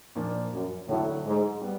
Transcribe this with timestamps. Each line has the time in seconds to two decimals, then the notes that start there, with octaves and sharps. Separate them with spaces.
0.15 A#2 F3 A#3 D4
0.52 F#2
0.88 A2 D3 F#3 A3
1.25 G#2
1.62 G3 B3